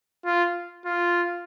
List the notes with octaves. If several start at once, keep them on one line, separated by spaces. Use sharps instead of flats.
F4
F4